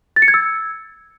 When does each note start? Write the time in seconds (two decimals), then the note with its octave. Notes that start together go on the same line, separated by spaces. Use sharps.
0.16 A6
0.22 C#7
0.28 G#6
0.34 E6